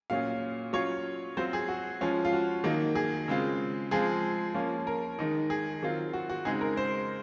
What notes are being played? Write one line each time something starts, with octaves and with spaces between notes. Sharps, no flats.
A#2 F#3 C#4 F4 F5
F#3 C#4 F4 C#5
F#3 C4 F4 C5
G#4
F#4
F3 G#3 C#4 F4
F4
F#4
D#3 F#3 A#3 D#4
G#4
C#3 G#3 C4 F4
F3 G#3 C4 F4 G#4
F3 A#3 C#4 F4
A#4
D#3 G#3 D#4
G#4
D#3 F#3 C4 F4
F#4
F#4
C#3 G#3 C4 D#4 G#4
A#4
C5